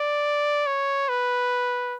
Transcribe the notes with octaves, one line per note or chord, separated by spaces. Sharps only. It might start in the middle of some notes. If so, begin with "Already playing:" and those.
Already playing: D5
C#5
B4